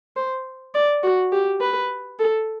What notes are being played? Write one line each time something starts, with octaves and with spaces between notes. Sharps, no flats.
C5
D5
F#4
G4
B4
A4